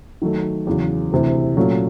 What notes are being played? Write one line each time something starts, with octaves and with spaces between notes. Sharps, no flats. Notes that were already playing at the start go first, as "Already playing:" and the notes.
D#3 F#3 A3
E2 C#3 F#3
D2 C3 E3
A#2 F#3 A3 C#4